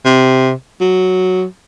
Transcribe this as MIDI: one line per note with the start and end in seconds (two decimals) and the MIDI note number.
0.05 0.51 48
0.81 1.44 54